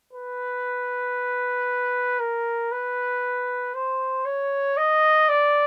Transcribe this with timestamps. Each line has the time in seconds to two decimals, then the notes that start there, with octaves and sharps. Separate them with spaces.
0.13 B4
2.20 A#4
2.72 B4
3.74 C5
4.25 C#5
4.77 D#5
5.29 D5